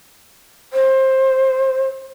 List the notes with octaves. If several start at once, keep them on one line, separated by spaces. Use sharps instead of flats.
C5